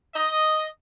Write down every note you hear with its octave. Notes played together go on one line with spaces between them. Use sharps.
D#5